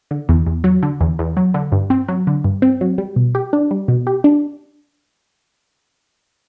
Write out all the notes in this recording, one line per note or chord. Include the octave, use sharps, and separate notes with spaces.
D3
E2
E2
F#3
D3
E2
E2
F#3
D3
G2
C4
F#3
D3
G2
C4
F#3
G3
B2
G4
D4
G3
B2
G4
D4